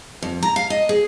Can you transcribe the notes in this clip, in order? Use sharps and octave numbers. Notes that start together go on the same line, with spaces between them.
F2
A#5
F5
D#5
G#4